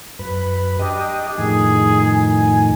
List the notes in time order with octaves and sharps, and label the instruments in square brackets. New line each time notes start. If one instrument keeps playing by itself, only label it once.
[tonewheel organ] F#2 B4
[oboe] D4 [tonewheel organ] G4 D#5
[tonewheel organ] F2 A2 D#3 [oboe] G#4
[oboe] G#5